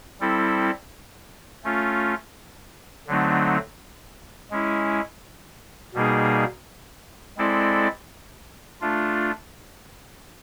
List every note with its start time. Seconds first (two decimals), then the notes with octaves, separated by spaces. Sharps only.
0.20 G3 C4 E4 A4
1.64 A3 C#4 F4
3.07 D3 F#3 A3 C4 D#4
4.51 G#3 C#4 E4
5.94 B2 G3 A#3 D#4 G#4
7.37 G#3 C4 E4 A4 D5
8.81 A3 D4 F4